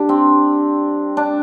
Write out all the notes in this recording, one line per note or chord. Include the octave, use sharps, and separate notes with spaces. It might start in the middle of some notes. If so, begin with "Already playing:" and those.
Already playing: G2 D4 G4
C4
D4